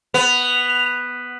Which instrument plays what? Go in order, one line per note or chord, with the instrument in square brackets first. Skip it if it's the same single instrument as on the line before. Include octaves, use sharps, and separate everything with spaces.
[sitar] B3 [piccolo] F7